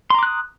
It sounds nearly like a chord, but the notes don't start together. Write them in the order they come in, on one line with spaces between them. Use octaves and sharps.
C6 A#5 D6 F#6 D#6